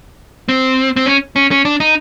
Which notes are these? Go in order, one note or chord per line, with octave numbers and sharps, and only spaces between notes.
C4
C4
C#4
C#4
C#4
D4
D#4